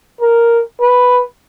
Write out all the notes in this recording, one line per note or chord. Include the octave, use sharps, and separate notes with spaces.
A#4
B4